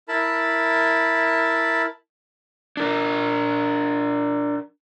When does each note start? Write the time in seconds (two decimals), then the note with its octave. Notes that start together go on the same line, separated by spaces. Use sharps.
0.08 E4 A#4 A5 B5
2.77 D4 A#4